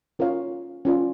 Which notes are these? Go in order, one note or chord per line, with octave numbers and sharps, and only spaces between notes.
C#4 F4 A#4 C#5 F5
C#4 F4 A#4 D5